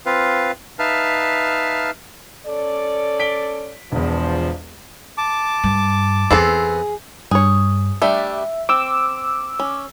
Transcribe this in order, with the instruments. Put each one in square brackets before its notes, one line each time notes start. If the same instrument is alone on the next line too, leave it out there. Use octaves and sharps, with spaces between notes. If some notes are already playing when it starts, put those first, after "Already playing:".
[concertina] C4 F4 B4 F5
D#4 B4 E5 F5 A5 F6
[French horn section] C#4 A4 D5
[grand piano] B6 D7 G7
[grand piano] E1 E2 [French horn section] F3
[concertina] A5 D6
[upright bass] G2
[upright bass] E2 [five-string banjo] B3 C4 A4 [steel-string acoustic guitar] G#4
[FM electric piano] G2 [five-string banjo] G#4 C#5
[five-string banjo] G3 A3 D4 [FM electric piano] E5
[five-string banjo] C4 [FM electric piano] D6 E6
[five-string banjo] C#4